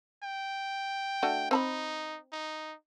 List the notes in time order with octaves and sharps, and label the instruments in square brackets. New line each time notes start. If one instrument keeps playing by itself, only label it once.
[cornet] G5
[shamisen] A3 D4 F#4
[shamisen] C4 A5 B5 [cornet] D#4
[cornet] D#4